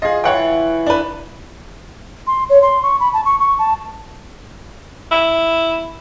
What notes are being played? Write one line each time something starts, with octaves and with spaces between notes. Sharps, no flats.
F4 G#4 D#5
E3 C#5 F#5 G5
D4 B4
C6
C#5
C6
C#6
B5
A5
C#6
C#6
A5
E4